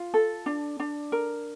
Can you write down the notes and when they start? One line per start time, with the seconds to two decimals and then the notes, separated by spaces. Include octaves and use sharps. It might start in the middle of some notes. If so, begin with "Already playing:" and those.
Already playing: F4
0.14 A4
0.46 D4
0.80 D4
1.12 A#4